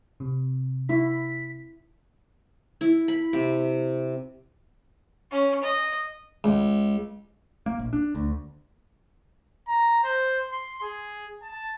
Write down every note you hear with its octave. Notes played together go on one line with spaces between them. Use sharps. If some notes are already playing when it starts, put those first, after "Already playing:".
C3
E4 B6
E4
B5
C3
C#4
D#5
C#2
A#3
A#1
D4
D2
A#5
C5
C6
G#4
A5